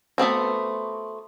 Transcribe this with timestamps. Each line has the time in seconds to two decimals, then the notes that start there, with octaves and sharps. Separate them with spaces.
0.18 A3 B3 C4 F#4